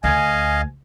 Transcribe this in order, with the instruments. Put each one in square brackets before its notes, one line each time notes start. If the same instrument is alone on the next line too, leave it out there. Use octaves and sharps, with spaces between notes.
[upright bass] D2 [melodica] D#5 F5 [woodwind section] G#5